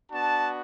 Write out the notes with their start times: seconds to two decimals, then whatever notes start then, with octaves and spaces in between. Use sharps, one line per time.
0.12 B3 D4 F#4 A5